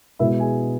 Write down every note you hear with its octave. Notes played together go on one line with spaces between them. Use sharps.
B2 G#3 B3 E4 E5
G#4 G#5